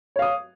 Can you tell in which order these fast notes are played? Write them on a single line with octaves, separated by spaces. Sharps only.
C#5 F5 D#6